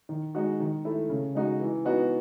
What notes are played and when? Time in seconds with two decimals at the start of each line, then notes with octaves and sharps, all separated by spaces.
0.09 D#3
0.35 G#3 D#4 F#4
0.60 D#3
0.85 A3 E4
1.10 C#3
1.35 G#3 D#4 F#4
1.60 E3
1.85 B3 D#4 F#4